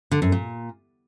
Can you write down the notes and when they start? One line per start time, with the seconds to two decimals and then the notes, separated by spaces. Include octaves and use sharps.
0.11 D3
0.22 F#2
0.32 A#2